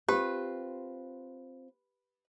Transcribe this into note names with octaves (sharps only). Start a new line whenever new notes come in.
C4 F4 G4 B4